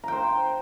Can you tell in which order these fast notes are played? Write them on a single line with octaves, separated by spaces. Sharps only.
A#5 G5 C5